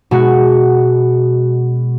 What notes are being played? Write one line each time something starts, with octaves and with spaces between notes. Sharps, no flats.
B2 G#3 F#4